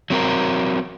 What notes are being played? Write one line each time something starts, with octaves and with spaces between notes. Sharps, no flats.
F#3 C4 A#4